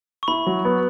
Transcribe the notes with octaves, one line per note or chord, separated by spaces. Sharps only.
C#6
E4 B5
F#3
B3